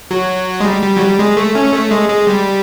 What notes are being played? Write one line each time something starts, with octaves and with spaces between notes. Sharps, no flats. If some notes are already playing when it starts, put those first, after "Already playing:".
F#3
G#3
G3
G3
F#3
G3
G#3
A3
C#4
A3
G#3
G#3
G3